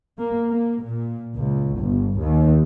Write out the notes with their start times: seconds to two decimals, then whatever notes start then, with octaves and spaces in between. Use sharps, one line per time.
0.19 A#3
0.50 A#3
0.83 A#2
1.35 C#2
1.79 G1
2.21 D#2